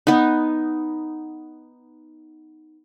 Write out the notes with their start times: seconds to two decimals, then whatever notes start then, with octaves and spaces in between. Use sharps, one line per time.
0.07 B3 D#4